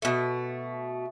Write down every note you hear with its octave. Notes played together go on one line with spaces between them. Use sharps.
B2 A3